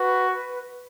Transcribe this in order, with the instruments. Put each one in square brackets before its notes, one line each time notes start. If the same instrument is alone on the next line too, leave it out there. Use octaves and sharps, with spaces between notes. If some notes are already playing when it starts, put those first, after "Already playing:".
Already playing: [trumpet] F#4 [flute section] B4
[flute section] B4